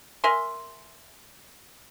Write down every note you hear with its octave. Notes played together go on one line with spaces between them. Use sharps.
A#4 E5 G#5 C6